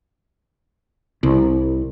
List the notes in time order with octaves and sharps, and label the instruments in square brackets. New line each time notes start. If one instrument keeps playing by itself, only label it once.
[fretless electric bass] C2